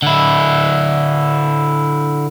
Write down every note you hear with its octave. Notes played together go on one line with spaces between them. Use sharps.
D3 E4